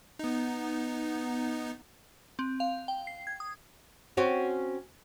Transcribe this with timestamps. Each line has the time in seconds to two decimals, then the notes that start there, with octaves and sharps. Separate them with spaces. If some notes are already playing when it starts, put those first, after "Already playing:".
0.19 B3 D#4
2.39 C4
2.60 F5
2.88 G5
3.07 C7
3.27 G#6
3.40 D#6
4.17 C4 C#4 F#4